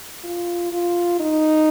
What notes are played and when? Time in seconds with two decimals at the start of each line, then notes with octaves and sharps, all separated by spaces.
0.24 F4
0.72 F4
1.20 D#4